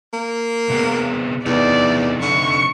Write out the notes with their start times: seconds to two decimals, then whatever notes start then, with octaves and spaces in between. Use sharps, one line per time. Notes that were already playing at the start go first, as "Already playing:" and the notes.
0.13 A#3
0.70 C3 B3 G#4
1.46 E2 C3 A3 D#4 D5
2.22 D3 C#6